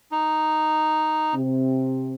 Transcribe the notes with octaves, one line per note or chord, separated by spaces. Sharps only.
D#4
C3 C4